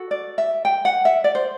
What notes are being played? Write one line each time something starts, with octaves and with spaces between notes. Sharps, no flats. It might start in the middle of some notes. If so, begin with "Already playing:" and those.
Already playing: F#4 A4
D5
E5
G5
F#5
E5
D5
C5